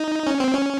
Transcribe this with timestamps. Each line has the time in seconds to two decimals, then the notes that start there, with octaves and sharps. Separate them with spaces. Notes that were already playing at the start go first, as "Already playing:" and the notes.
Already playing: D#4
0.27 C#4
0.40 C4
0.54 C#4